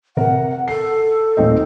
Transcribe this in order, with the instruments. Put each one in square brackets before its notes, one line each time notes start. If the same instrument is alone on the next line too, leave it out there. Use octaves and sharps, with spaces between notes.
[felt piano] C3 A#4 [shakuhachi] F#5
[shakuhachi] A4 [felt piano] C7
[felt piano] D#1 C4 D#4